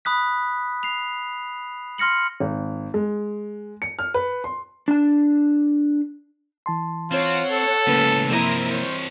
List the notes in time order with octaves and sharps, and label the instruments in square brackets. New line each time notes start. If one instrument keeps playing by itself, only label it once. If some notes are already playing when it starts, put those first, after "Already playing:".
[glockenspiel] B5 D#6 F#6 B6
C7 F7
C6 F6 A#6 C#7 F#7
[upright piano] G#1
G#3
C#7
F6
B4
C6
[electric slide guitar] D4 A5
[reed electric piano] E3 A5 C6
[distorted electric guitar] C4 [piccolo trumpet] F4 [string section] C#5 F#5
[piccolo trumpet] A4
[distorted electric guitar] C#2 A2 [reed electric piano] A#3 C#4 B4
[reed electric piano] C3 F3 A#3 [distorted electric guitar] C4 D#5 [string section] E4 A#4 C5
[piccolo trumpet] C5 [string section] C#5